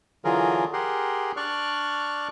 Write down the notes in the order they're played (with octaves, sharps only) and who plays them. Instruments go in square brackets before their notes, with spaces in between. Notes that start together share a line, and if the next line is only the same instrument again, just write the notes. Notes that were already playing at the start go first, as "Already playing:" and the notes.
[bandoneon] D3 E3 F#3 F4 G#4 A#4
G4 G#4 A#4 F#5 C6
D4 D5 C#6 F6 F#6